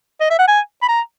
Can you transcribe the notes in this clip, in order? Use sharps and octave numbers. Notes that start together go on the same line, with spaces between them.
D#5
E5
F#5
G#5
B5
A#5